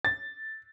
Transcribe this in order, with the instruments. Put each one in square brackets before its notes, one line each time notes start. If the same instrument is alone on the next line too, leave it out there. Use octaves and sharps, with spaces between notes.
[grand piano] A6